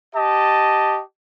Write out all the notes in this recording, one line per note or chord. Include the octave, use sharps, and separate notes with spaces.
G4 D#5 A5